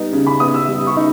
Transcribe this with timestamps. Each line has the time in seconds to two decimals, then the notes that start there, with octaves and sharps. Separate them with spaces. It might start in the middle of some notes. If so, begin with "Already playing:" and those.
Already playing: G3 B3 D#4
0.13 C#3
0.27 B5
0.40 B3 D#6
0.54 E6
0.68 G3
0.87 C#6
0.97 D#4